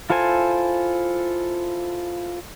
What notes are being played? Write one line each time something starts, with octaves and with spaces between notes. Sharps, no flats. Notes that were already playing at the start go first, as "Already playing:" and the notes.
E4 F4 A4 C5 G#5